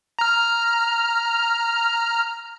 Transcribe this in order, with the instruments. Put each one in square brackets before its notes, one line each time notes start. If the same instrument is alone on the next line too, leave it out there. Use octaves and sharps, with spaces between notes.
[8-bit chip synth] A#5 F6